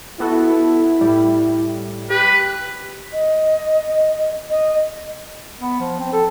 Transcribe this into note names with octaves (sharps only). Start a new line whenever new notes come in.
B3 E4 F#4 A4
A2 G3
G4 B4
D#5
D#5
B3
F3
C4
A4